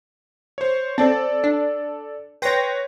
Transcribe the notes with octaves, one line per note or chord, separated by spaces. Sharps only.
C5 C#5
C4 A4 D5 A5
D4
B4 C#5 G5 C6 A#6